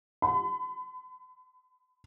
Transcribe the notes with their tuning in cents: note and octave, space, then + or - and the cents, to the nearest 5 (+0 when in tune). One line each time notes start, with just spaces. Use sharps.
B5 +30